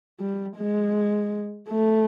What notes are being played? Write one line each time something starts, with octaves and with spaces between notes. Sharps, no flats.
G3
G#3
A3